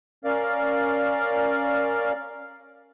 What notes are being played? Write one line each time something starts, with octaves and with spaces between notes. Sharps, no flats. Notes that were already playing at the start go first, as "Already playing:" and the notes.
C#4 A#4 D5 F5